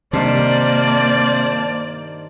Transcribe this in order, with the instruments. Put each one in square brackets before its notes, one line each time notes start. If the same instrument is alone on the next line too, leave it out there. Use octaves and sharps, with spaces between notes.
[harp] G2 D#3 D4 [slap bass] C3 [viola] A#3 D5 [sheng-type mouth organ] C5 A5